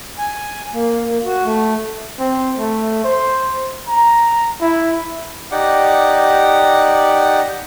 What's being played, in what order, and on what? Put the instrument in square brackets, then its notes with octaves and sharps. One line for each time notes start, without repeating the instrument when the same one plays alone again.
[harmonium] G#5
A#3
A#3
F#4
A3
[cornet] C4
A3
C5
A#5
E4
[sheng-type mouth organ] D#4 G4 D5 F#5